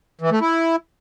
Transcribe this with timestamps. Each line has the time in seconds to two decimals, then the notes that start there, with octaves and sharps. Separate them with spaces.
0.21 E3
0.31 A3
0.41 E4